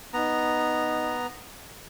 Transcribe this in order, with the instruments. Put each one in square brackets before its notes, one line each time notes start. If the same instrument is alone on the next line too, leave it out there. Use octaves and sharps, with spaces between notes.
[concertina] B3 A#5 [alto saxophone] D#4